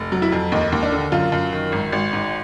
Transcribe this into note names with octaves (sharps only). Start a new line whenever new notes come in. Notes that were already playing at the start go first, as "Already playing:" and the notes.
Already playing: F1
F#3
E4
F2
D#2 D#4
D#2
D4
D3
F#2 F4
F#2
D#3
G#1
G#1
G#2